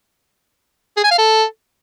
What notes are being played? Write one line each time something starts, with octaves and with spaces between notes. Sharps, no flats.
G#4
G#5
F5
A4